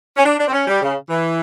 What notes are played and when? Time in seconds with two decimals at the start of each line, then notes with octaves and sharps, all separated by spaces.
0.17 C#4
0.24 D4
0.38 D4
0.48 C4
0.52 C#4
0.66 G3
0.81 C#3
1.09 E3